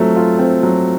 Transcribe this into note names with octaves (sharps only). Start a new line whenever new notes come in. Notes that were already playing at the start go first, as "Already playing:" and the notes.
Already playing: F#3 A3 C4 F4
F4
C4
F#3